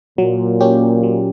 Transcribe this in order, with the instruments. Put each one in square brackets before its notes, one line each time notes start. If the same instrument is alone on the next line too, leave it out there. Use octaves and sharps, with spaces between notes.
[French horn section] A#2 [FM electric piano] F#3
[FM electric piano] A#3 C#4 G4
F#3